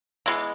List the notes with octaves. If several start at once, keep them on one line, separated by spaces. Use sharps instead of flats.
E3 G#3 B3